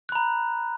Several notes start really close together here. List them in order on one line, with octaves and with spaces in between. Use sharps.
F#6 B5 A#5